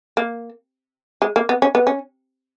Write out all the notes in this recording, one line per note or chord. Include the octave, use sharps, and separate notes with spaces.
A#3
G#3
A#3
B3
C#4
B3
C#4